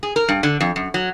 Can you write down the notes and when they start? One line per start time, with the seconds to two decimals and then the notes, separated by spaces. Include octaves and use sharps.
0.03 G#4
0.16 A#4
0.29 G2
0.43 D3
0.60 F2
0.76 F#2
0.94 F#3